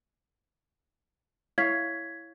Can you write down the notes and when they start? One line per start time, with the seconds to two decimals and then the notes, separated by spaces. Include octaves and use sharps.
1.58 E4 C#5 F5 G#6 B6